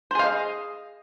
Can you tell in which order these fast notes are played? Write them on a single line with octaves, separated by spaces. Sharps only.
C5 G#4 F5 D#5